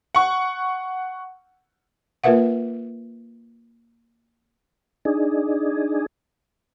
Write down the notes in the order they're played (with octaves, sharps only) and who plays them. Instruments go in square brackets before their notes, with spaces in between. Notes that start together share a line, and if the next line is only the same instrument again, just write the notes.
[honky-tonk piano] F#5 C#6
[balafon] A#3 F4 A#4 B4 E5 F#5
[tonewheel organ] D4 D#4 G#4